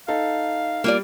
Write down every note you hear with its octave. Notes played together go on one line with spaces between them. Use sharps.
D#4 A4 F5
G3 A#3 F4 D5